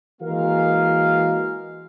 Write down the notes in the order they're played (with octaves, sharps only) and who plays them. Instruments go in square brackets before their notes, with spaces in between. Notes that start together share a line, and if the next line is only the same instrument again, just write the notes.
[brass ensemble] E3 G#3 A#3 F#4 A#4 F5